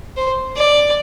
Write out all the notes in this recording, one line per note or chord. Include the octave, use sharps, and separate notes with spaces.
C5
D5